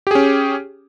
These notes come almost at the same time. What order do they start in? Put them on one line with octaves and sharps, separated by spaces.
G4 G#4 C#4